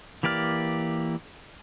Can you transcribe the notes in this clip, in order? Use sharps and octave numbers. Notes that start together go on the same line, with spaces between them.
E3 A#3 G4 D5 F6